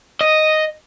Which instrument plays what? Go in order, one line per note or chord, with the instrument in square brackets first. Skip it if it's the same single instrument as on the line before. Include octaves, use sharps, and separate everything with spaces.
[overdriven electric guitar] D#5